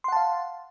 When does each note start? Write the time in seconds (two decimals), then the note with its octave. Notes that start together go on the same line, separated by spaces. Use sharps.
0.04 C6
0.08 F#5
0.12 A5
0.16 F5